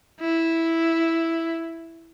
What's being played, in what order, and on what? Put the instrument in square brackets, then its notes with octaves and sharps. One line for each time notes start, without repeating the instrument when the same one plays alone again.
[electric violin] E4